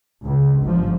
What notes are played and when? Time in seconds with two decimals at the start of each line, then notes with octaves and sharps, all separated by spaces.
0.25 C#2
0.63 G1 G#2 F3